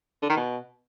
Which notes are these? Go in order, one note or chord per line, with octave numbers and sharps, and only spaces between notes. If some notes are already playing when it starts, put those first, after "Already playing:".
D3
D#3
B2